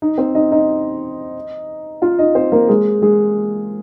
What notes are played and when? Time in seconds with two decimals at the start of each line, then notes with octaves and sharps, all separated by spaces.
0.02 D#4
0.18 C4 C5
0.35 D#4 D#5
0.52 D#4 D#5
2.02 F4 F5
2.19 D#4 D#5
2.35 C4 C5
2.52 A#3 A#4
2.69 G#3 G#4
3.02 G#3 G#4